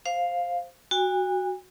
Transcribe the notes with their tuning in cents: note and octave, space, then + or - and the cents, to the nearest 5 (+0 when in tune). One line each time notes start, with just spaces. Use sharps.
C5 +0 F5 +5
F#4 +0 G#5 -45